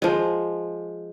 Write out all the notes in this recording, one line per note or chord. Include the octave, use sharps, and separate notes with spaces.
F3 G#3